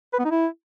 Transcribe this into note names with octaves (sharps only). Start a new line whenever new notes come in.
B4
B3
D#4
E4